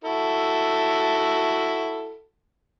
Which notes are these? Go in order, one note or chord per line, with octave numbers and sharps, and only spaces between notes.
E4 F#4 A4